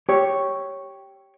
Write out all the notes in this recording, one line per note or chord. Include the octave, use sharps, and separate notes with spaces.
G4 C#5